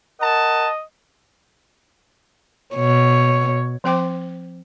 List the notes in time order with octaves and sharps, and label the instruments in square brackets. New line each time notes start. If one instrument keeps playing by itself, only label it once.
[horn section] A#4 F#5 A5 [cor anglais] D#5
[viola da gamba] B2 [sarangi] C#5
[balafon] F3 C4 C5 G5 C6 D6